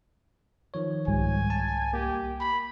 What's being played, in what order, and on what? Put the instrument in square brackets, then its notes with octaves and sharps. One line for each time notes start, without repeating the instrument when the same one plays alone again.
[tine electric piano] D#3 F3 C#5
[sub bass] C2 [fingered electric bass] G#2 G3 [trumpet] G#5
[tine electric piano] A5
[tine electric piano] A#3 [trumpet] G4
[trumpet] B5